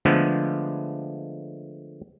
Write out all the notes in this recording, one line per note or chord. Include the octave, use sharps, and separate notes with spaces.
D3 F3 G#3 A3 B3